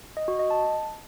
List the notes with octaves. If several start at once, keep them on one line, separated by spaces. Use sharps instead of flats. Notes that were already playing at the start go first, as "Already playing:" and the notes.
D#5
F#4
D#5
A5